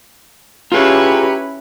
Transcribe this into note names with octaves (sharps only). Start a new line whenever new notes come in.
C#4 E4 F4 G4 G#4 B4 A#5